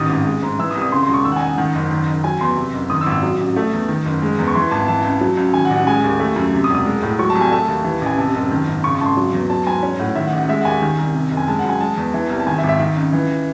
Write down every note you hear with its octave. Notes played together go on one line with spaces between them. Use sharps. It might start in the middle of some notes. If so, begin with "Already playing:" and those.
Already playing: A1 D#3 D#6
G#1
G#3
G#2
E3 E6
D#6
C2
D#6
C#3 C6
C6
E1
C#6
D#3 E6
F#5
G#5
C#2
F#5
D#3 F#5
F#1
D#3
F#1
F#3 G#5
E2 C6
C3
F#1
D#3 D#6
E6
G#1
E6
F#3
A1
A3
E2
D#3
F#1
G#3
E2
C#6
E3 C6
G#1 A5
E3 A5
C#2
F#3
C#2
D#3 G#5
F#5
A1
F#5
G#3 G#5
D#2
A3
F#2
C3
D#6
E1
D#6
G#3
A2
F#3 C#6
A5
C2
G#5
A3 A5
D#2
E3
A1 G#5
C3 A5
F#1
D#3
G#1
C#3 C#6
C#6
G#1 A5 C6
F#3
E2
F#3 A5
G#2 G#5
C#4
A2 F#5
D#3 E5
F#5
A1
F#5
G#3 E5
F#5
D#2 G#5
D#3
C2
C3
F#1
G#5
G#3 A5
F#5
F#2 G#5
G#3 A5
E2
E3
C2
A5
D#3 G#5
E5
G#1
E5
D#3
C#2
E3